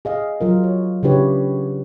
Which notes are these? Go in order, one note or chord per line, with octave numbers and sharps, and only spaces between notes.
G#4 D#5 F5
F#3 F4 A#4
C#5
C#3 D4 E4 G4 B4 C#5